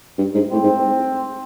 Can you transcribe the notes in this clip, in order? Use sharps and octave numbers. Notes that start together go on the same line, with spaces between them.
G2
G#2
A2 C4
G#2